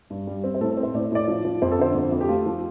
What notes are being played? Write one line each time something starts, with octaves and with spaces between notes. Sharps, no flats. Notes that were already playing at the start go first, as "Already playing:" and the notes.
G2
G3
C4
C5
A2 A4
A4
C4
C5
A2 D5
A2 D5
F3
F3
F2 C5
A4
D3 C5
F2
F2
G4
A3 F4
F3